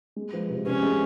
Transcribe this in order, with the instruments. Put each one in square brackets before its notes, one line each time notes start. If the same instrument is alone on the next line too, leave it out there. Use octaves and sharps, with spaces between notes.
[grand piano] G#3
F3
C3
[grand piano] C3 [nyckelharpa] C#4
[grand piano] G#3